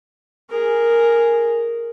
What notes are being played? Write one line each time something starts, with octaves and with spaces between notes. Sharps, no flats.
G#4 A#4